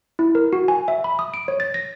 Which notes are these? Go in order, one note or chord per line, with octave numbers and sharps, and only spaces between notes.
E4
A#4
F#4
G#5
E5
B5
D#6
D7
C#5
A6
A#6